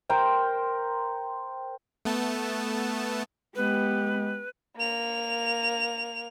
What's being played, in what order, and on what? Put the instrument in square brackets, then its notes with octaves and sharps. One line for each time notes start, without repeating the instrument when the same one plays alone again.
[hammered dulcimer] A#4 C5 G5
[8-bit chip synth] A3 B3 A5
[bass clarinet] G#3 [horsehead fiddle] B3 G4 [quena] B4
[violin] A#3 F7